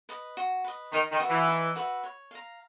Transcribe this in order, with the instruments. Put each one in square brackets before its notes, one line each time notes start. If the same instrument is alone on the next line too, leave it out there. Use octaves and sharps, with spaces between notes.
[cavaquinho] B4 D#5
F#4
B4 D#5
[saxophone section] D#3 [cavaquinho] D#4
[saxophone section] D#3
[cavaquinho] F#4 B4 E5
[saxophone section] E3
[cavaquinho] D#4
F#4 B4 E5
C#5
F5 A#5